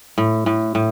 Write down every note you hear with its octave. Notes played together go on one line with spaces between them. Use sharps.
A2
A2
A2